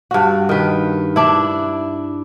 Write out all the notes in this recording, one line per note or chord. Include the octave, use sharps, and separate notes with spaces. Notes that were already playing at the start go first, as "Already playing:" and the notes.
G2 F#4
D#3 B4
D4 E4